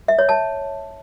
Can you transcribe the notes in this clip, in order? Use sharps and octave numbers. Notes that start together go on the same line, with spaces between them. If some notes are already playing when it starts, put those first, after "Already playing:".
E5
C#5
A5